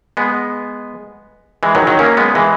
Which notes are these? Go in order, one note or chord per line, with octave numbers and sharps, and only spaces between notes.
G#3 B3
E3 G#3
D#3 F#3
D#3 F#3
A#3 C#4
G#3 B3
E3 G#3